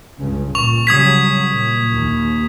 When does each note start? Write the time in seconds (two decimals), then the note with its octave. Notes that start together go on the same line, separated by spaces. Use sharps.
0.18 C#2 G2 C#3
0.55 A#2 C#6 F7
0.87 C#3 F#3 G3 D#6 G#6 B6
1.50 A#2
1.93 D#2